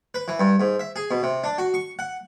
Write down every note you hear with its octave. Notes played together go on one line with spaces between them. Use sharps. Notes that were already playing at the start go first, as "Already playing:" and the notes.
B4
E3
G2
G#2
E5
G#4
B2
C3
D4
F#4
C#6
F#5